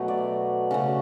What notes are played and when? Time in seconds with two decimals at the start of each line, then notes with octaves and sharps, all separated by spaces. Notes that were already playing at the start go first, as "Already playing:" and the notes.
Already playing: B2 F#3 A3
0.08 D5
0.71 C#3 F#3 A3